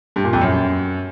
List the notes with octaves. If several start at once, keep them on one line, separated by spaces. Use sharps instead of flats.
G2
A#2
F2
F#2